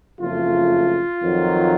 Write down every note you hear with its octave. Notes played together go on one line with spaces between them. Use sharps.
F#1 F2 C#3 A3 F4
F2 D#3 F#3